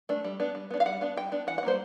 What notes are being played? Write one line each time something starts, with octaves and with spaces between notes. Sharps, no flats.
A3 D4
G3
B3 D4
G3
B3 D4
F5
G3 F#5
B3 D4
G3 G5
B3 D4
E3 F#5
F#5
G3 A#3 C#4 C5